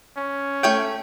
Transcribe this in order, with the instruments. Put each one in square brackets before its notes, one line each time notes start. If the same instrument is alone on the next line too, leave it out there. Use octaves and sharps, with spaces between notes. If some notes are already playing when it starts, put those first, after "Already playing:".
[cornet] C#4
[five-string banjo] A3 C#5 G5